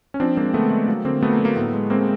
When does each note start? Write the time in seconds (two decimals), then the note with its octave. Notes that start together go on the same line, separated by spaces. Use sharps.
0.14 C#4
0.20 F3 C4 D4
0.37 G#3 A#3 C4
0.54 D3 A3 B3
0.71 G#3 A3
0.88 F#3 A#3
1.05 D3 A#3 C4
1.22 F#3 A3 B3
1.33 A#3
1.40 F#3
1.45 A#3
1.56 A2 A3 B3
1.73 G#3
1.90 G#3 A#3 C4